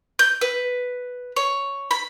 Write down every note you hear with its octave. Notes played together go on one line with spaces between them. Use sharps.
G6
B4
C#5
B5